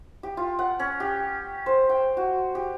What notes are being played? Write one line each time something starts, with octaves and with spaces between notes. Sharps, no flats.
G4
F4
F#5
C#4
G4
C5
G5
F#4
G4